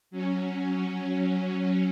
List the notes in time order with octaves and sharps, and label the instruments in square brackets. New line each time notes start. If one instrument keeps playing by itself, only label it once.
[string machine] F#3 C#4